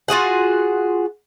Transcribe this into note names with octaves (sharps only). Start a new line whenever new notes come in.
F4 F#4 G#4 F#5